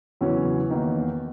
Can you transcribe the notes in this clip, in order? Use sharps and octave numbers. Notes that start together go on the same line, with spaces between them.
E2 C#3 F#3 C#4 E4
E2 D#3 A#3